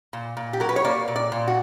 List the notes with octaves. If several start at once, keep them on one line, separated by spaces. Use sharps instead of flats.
A#2
A#2
G4
F#3 A#4
B4
C#5
A#3 D5
A#2
D5
A#2
F#4